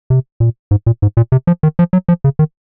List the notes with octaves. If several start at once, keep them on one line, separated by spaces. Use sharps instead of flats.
C3
A#2
G#2
A#2
G#2
A#2
C3
F3
D#3
F3
F#3
F3
C#3
D#3